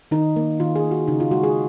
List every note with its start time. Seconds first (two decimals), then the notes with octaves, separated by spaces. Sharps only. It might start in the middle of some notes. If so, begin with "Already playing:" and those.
0.11 D#3 D#4
0.36 A#3
0.60 D#3 F4
0.76 G#4
0.84 A#3
0.91 F#4
1.08 C#3 D#4
1.20 F4
1.31 G#3 F#4
1.44 G#4